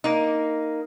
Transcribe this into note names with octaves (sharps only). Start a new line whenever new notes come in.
A#3 D#4